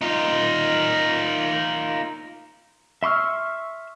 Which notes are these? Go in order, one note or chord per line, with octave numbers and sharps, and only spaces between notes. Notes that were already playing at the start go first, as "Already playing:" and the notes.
D#4 F4
E5 C6 C#6 E6 F6